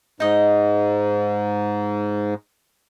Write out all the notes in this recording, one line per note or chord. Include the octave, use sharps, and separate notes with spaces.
G#2 D#4 D#5